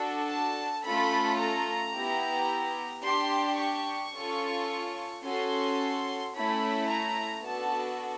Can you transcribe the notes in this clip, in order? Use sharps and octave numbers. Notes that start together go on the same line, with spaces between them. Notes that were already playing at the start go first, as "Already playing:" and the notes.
Already playing: D4 F#4 A4
A5
A3 C#4 F4 A4 B5
A#5
B3 E4 G4
D4 G4 C6
C#6
C#4 F4 A4
C#4 F#4 A4 C6
A3 C#4 E4 B5
A#5
B3 D4 F#4 A4 A5